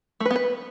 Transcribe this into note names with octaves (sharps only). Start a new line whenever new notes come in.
A3
B4
B3
B4